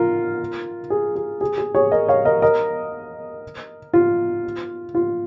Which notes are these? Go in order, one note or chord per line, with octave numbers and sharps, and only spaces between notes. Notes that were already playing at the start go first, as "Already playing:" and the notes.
Already playing: F4 A#4
G#4
G#4
G#4
G#4
G#4 C#5
A#4 D#5
C#5 F5
A#4 D#5
A#4 D#5
F4
F4